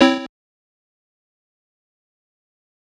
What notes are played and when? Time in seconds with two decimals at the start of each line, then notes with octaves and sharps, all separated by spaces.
0.01 C4 E4 C#5